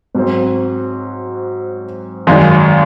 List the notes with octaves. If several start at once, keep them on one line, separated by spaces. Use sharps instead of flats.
G#2 F#3 C4
G#1 F#2 D#3 G#3 D#4